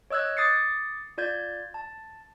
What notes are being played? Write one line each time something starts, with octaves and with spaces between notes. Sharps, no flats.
C#5 D#5 E6 F#6 G#6
D6 D#6 A6 C7 C#7
F4 D5 G6 G#6
A5